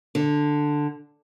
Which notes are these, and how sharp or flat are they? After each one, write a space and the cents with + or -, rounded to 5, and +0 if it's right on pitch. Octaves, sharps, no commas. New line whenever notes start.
D3 +5